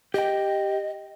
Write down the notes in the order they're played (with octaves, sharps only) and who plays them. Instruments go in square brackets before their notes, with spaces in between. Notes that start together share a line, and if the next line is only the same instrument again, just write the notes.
[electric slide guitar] G4 G5 [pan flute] D#5